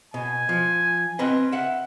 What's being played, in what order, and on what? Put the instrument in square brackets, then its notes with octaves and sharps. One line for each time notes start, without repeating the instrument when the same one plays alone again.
[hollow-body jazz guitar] B2 [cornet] G#5
[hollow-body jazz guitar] F3
C4 B4 D#5
E5 F#5